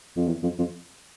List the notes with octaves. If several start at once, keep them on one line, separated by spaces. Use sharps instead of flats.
F2
E2
F2
F2